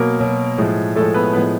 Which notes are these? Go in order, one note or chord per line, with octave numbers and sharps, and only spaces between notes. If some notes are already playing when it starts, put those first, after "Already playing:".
Already playing: B2 F#3 A#3 A#4
B2 F#3
A2 F3 G#3
A2 F3 G#3 A3 A4
B3 B4
A2 F3 G#3 B3 B4